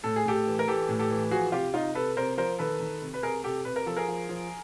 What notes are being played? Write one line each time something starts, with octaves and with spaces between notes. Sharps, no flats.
A2 A4
G#4
A2 G4 A4
E3
A#4
E3 G4 A4
A2
G4 A4
E3
F3 F#4 G#4
C3 F4 G4
C3 D#4 F4
C3 A4 B4
C3 A#4 C5
F3 A#4 C5
D#3 A4 B4
D#3
C3
B4
C3 G#4 A#4
C3 G4 A4
C3 B4
A#4
F3 A4
G#4 A#4
F3
F3